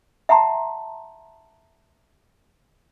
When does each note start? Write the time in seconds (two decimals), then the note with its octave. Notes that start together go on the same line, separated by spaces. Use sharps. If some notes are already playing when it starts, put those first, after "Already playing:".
0.29 E5 F#5 A5 A#5 C6